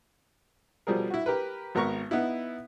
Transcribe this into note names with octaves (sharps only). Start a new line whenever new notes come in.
B2 F3 G3 G#4 A#4
E4 F#4
G4 A#4 B4
G#1 B3 A#4 A#5 C#6
B3 D#4 E4